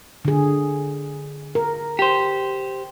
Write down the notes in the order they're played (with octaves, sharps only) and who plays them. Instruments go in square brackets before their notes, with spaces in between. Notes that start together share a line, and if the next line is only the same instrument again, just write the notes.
[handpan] D3 G#4
A#4
[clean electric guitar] G4 C5